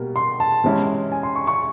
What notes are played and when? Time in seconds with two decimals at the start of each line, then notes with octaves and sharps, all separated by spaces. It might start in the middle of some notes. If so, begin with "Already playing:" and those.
Already playing: B2 G3 A#3
0.16 C6
0.40 A5
0.64 C3 E3 G#3 C#4 E4
1.12 G#5
1.23 C6
1.36 C#6
1.47 C#6